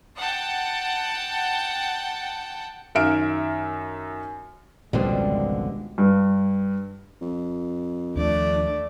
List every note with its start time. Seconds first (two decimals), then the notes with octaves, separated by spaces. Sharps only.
0.17 F#5 G5 A5
2.95 F#2 D#3 E5 F6 D7
4.93 G#1 C#2 B2 D3 F3 G3 G#3 C4
5.98 G2
7.22 F2
8.16 D#2 F3 A3 D4 D5